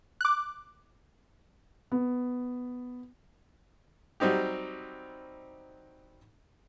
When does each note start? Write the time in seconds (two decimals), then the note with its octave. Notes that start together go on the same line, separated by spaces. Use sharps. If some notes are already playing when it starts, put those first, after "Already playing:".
0.21 D6 F#6
1.92 B3
4.20 F#3 G3 C4 D#4 G4